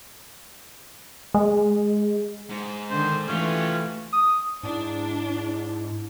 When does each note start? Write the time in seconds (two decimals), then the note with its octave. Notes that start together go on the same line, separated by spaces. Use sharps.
1.34 G#3
2.49 G#2
2.90 D3 D#3 C5
3.28 E3 A3 C#4 F4 G4
4.13 D#6
4.63 G#2 D4 E4